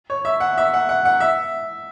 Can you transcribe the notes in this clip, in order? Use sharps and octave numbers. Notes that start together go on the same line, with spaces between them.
C#5
E5
F#5
E5
F#5
F#5
F#5
E5